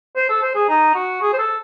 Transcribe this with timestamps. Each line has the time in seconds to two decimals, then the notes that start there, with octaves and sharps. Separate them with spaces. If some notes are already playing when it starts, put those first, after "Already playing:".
0.16 C5
0.29 A4
0.42 C5
0.55 G#4
0.69 D#4
0.95 F#4
1.22 G#4
1.33 C5
1.39 A4